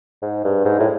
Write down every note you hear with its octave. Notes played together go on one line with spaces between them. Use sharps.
G#2
G2
G#2
A2